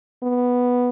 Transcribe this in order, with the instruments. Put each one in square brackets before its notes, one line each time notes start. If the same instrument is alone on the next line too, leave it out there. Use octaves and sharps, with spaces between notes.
[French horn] B3